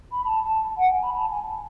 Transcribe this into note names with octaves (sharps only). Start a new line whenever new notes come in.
B5
A5
A5
F#5
G#5
B5
A5
G#5